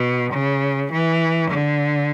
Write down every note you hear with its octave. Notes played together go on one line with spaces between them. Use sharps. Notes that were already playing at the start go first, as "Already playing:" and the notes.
Already playing: B2
C#3
E3
D3